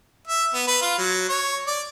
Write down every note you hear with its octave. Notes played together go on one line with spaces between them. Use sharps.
E5
B3
B4
F4
F#3
C#5
D5